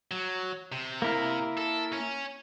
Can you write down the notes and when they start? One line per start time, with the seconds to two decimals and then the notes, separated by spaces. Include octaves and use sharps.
0.11 F#3
0.72 C3
1.02 A#3 E4 A#4
1.57 A4
1.93 C#4